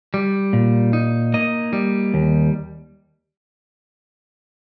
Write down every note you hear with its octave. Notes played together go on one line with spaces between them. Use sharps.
G3
A#2
D#4
A#3 D#5
G3
D#2